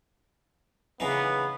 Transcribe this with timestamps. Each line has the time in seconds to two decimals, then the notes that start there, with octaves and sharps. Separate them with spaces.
1.00 C#3 E3 B3 D#4